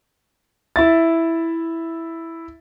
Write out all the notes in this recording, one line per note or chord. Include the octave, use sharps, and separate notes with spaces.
E4 E5 A6